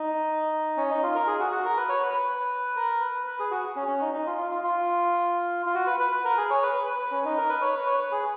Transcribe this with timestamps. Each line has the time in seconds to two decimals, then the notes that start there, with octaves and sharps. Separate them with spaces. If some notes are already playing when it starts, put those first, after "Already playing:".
Already playing: D#4
0.77 C#4
0.90 D#4
1.03 F4
1.15 A#4
1.27 G#4
1.40 F#4
1.52 F#4
1.65 A#4
1.77 B4
1.89 C#5
2.02 B4
2.14 B4
2.76 A#4
3.01 B4
3.27 B4
3.39 G#4
3.51 F#4
3.76 C#4
3.88 C#4
4.01 D#4
4.14 D#4
4.27 F4
4.38 F4
4.51 F4
4.64 F4
5.66 F4
5.75 F#4
5.87 B4
6.00 B4
6.12 B4
6.25 A#4
6.38 G#4
6.50 C#5
6.63 B4
6.75 B4
6.87 B4
6.99 B4
7.11 C#4
7.25 D#4
7.37 A#4
7.50 B4
7.61 C#5
7.75 B4
7.86 C#5
8.00 B4
8.12 G#4